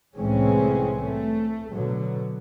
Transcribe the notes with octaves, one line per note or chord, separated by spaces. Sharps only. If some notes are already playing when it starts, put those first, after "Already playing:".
C2 A2 E3 G#3 C4 C#4
A3
B2 D3 F#3